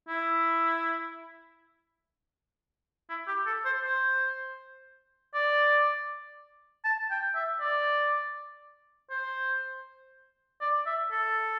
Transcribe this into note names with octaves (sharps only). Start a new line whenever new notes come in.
E4
E4
G4
A4
C5
C5
D5
A5
G5
E5
D5
C5
D5
E5
A4